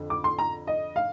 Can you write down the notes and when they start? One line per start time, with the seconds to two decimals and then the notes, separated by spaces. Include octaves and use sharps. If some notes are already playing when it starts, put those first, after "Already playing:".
Already playing: F2 D3
0.10 D6
0.24 C6
0.39 A#5
0.67 D#5
0.96 F5